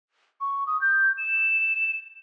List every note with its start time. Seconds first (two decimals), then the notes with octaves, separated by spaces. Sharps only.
0.41 C#6
0.67 D#6
0.81 G6
1.18 E7